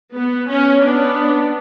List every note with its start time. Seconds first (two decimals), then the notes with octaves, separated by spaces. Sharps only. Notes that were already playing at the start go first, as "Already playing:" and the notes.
0.14 B3
0.48 C#4
0.82 B3 D4